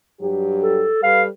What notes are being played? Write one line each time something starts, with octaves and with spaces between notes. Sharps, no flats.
G2 F#3 G4
A4
G3 A4 B4 F5